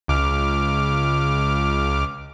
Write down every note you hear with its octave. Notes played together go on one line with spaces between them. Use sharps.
C#2 D6 F6